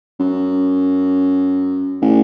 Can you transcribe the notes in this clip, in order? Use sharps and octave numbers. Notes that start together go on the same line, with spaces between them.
F#2
A1